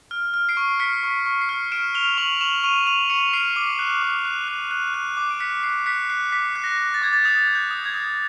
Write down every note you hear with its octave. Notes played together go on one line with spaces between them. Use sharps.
F6
F6
C7 D7
C#6
F6 B6 C#7
C#6
B6
C#6
C7
F6
F6 D7 E7
F6 F7 G7
C#6 E7 F#7
C#6 E7 F#7
C#6 D#7 F7
C#6 D#7 F7
C#6 C#7 D#7
F6 C7 D7
D6
F#6
D6
F#6
F#6
F#6
F#6
D6
D7
F#6 B6 C#7
F#6 C7
F#6 B6 C#7
F#6 C7
D6 B6
F#6
A#6
F#6
A6
D6 G#6
A6
D#6 G6
F#6
G6
D#6
G#6
D#6